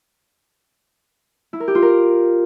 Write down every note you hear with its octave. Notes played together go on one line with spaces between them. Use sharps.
E4
A#4
G4
F4
A#4